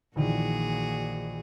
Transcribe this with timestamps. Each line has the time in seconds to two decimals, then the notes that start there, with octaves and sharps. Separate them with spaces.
0.16 A#1 A#2 D#3 E3 F#4 G#4